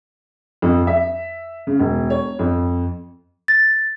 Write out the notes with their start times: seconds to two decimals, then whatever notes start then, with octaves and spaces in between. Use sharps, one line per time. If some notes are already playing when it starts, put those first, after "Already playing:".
0.62 F2
0.87 E5
1.67 C#3
1.80 E1
2.10 C#5
2.39 F2
3.48 A6